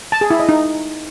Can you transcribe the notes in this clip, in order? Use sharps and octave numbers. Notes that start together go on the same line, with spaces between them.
A5
G#4
E4
D#5
D#4